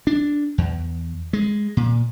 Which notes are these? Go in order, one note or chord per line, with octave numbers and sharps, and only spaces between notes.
D4
E2
G#3
A#2